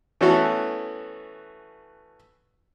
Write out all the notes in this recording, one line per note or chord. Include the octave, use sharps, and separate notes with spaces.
E3 A3 B3 C#4 F#4 A4